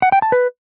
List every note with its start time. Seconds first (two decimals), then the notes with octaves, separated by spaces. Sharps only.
0.02 F#5
0.12 G5
0.22 A5
0.32 B4